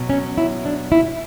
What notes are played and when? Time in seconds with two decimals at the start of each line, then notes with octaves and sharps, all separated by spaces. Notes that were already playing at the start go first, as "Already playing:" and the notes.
Already playing: B2 F#3
0.10 C#4
0.38 E4
0.65 D4
0.92 E4